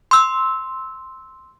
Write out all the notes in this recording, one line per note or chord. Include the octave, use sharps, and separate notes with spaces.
C6 E6